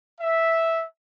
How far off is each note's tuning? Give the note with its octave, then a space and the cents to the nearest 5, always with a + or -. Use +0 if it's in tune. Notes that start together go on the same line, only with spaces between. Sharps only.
E5 -5